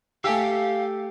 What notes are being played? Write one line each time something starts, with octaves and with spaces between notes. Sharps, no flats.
A3 G4 F5 G#5 E6